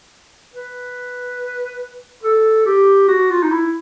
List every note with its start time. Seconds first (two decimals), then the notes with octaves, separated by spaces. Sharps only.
0.54 B4
2.23 A4
2.66 G4
3.08 F#4
3.30 F4
3.43 D#4
3.51 E4